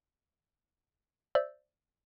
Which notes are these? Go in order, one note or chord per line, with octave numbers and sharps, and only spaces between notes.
C5 D5 E5 E6 G6